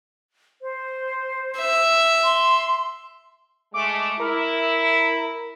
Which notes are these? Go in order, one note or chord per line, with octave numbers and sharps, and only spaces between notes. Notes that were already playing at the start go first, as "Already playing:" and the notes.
C5
E5
C6
G#3 A3 D6
E4 A#4